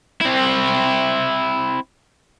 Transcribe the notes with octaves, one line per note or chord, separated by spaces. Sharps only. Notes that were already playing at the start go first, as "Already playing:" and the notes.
C4 E4